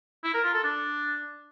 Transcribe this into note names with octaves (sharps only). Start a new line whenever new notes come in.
E4
A#4
F4
A4
D4